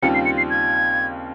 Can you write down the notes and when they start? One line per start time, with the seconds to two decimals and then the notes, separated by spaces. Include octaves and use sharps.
0.02 D#2 C#3 G3 C4 F4 C#7
0.14 C7
0.25 C#7
0.38 C7
0.50 G#6